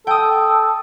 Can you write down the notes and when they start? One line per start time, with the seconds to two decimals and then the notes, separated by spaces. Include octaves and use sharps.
0.07 A4 G5 D#6